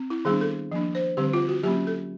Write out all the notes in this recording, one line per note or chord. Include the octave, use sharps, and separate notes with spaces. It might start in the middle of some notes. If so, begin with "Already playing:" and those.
Already playing: C4
E4
D#3 G3 B3 D4 G#4
A4
F3 A#3 D4
C5
D3 G3 C4 G4
F4
F#4
F#3 A#3 C#4 G4
A4